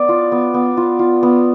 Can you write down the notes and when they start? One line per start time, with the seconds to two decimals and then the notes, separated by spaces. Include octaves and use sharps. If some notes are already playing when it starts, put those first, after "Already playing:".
Already playing: B3 D5
0.09 F4
0.32 B3
0.54 B3
0.77 F4
0.99 F4
1.23 B3